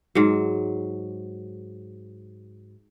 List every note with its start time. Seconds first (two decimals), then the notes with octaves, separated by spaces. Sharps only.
0.15 G#2 F#3